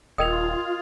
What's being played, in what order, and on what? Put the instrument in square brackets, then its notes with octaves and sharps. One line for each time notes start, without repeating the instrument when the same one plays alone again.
[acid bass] D#1 [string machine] F4 [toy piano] A#4 D#5 G5 [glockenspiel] D#6 G#6 F7